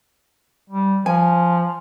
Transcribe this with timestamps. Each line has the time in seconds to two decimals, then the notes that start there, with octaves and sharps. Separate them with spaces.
0.70 G3
1.06 F3 G#5